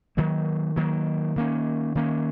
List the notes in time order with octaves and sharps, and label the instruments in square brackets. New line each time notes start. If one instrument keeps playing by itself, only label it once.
[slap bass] D#3 F#3 A#3
D#3 F#3 A#3
D#3 A#3 C#4
D#3 A#3 C#4